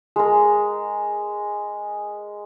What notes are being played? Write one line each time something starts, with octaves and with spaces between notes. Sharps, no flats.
G#3 A#4